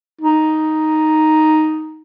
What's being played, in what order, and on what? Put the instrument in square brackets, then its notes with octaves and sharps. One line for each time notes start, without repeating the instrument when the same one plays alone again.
[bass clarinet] D#4